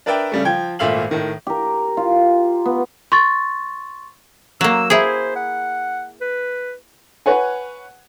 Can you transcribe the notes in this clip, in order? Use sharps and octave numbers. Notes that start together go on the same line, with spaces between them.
D4 A#4 B4 D5 E5 G5
C#3 G3 A3
F3 G5 G#6
G#1 A#2 A3 E5 F5 F#7
A2 D#3
G4 A#4
F4
B3
C6 C#6 A6
F#3 A#3 E6
E4 G#4 C5
F#5
B4
B4 C#5 F#5 G#5